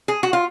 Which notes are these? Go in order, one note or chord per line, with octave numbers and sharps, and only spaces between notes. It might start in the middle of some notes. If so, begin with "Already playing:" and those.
G#4
F#4
F4